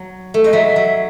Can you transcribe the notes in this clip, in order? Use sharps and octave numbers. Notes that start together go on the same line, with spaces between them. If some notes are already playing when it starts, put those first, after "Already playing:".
Already playing: F#3
A3
G#3 D#5
F#3 E5
F#3